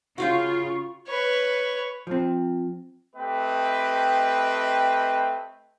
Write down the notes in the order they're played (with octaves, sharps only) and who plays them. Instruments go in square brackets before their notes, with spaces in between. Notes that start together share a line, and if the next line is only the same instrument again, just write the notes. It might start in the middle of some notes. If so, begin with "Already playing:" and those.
[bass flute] C#3 [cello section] F4 [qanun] F#4 F5 G5 [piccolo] C#6
[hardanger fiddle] B4 C#5
[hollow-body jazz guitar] F3 C4
[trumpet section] A3 C4 G4 B4 D#5 G5